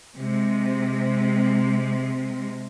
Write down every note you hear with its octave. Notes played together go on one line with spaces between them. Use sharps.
C3 G#3